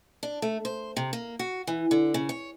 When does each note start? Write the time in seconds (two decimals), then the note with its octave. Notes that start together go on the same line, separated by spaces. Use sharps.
0.23 D4
0.42 A3
0.65 C5
0.97 C3
1.13 A#3
1.39 F#4
1.67 E3
1.91 D3
2.14 C#3
2.29 C#5